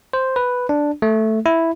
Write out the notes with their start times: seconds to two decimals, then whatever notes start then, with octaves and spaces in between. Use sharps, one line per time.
0.13 C5
0.36 B4
0.69 D4
1.02 A3
1.46 E4